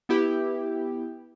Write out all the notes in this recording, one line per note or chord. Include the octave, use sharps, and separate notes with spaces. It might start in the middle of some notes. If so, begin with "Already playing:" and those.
B3 E4 G4